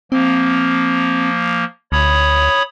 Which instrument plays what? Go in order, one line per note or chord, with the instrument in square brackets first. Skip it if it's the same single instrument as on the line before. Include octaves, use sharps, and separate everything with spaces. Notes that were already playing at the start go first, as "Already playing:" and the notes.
[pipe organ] F3 A#3 [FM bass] C4
[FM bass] D2 [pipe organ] C#5 B5 D#6